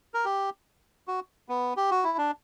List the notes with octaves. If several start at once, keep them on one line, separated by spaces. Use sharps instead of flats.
A#4
G4
F#4
B3
G4
F#4
E4
D4